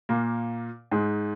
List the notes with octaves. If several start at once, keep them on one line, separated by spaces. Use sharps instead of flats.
A#2 A#3
G#2 G#3